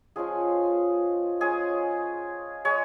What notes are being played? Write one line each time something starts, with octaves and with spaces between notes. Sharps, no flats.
F3 G#3 C#4 F4 G#4
G#3 C#4 F4 G#4
G#3 C#5